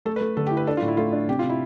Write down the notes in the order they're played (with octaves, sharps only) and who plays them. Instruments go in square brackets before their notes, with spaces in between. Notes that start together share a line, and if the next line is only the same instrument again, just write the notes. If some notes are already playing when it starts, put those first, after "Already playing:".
[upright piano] A3 [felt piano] A4
[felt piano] B4
[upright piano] A3
[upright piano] D3 [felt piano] A4
[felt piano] G4
[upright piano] E4
[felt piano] B4
[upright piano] D4 [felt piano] A4
[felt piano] F4
[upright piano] A2
[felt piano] E4
[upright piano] A3 [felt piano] F4
[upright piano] D4
[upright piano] C3 [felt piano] G4
[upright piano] C3 [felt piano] F4
[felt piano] E4